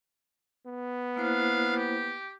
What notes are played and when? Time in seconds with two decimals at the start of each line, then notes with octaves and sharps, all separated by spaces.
0.66 B3
1.16 A#3 D4 E4 C5 F5
1.75 G4